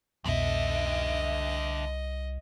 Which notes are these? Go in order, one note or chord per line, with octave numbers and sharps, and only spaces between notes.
C2 F2 B2 D3 F3 D#5 E5